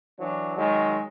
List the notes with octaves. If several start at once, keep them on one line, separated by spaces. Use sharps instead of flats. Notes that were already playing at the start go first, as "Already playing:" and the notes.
E3 F#3 D4
D#3 F#3 G#3